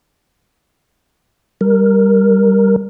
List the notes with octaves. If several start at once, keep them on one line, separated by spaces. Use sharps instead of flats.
G3 A#4